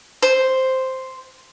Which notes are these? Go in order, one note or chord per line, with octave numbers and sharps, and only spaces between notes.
C5